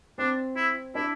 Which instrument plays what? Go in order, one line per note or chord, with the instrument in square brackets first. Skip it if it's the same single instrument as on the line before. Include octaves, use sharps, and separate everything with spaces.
[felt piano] C4 [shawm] D4
[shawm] E4
[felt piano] D4 [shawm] E4